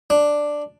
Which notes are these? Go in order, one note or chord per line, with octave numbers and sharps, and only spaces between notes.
D4